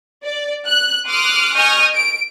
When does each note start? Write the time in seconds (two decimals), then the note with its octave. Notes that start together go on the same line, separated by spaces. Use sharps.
0.23 D5
0.67 F#6
1.07 C6 D6 D#6 F6 F#6
1.55 D#5 G#5 C#6 D#6 F6 G6
1.94 D7